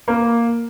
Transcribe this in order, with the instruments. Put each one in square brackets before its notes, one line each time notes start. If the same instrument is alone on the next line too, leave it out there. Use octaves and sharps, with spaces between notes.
[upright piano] A#3